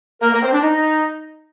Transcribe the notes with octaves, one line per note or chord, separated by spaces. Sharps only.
A#3 A#4
A#3 A#4
C4 C5
D4
D#4